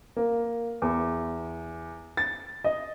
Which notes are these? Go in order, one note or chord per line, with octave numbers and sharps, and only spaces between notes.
A#3
E2
A6
D#5